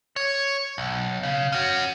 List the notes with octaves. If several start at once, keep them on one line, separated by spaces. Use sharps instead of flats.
C#5
B1
C#3
C#4 F#4